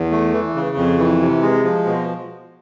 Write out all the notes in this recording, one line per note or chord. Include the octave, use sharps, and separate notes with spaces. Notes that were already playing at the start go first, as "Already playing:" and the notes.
Already playing: E2
A3
E3
C#3
F2
E3
C3
G#3
F3
B2